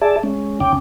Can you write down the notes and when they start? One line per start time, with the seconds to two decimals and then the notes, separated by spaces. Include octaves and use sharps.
0.02 G#4 D5 E5 A5
0.23 G#3 C#4
0.60 D#2 C#3 C#4 G5 D6